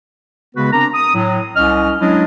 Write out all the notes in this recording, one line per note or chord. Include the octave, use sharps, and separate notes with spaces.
C#3 G#3 B3 F#4 B4
C4 D4 A#4 A#5
D#6
A2 F#3
C2 C#4 D#5 F6
F#3 G#3 C#4 D4 E4 D#5